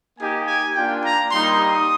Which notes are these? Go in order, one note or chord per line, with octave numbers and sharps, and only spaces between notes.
A#3 D#4 G4 G#5
G#5
A#3 D4 F4 G5
A#5
G3 A#3 D#4 G4 C6
D#6